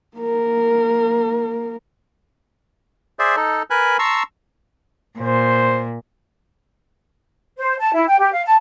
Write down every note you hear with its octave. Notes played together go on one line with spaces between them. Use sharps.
A#3 A#4
G#4 C5 D5 E5
D#4 A4
A#4 B4 G#5 F#6
A5 A#5 C6 C#6 E6
A#2 C5
C5
A5
E4
G5
G4
F5
A5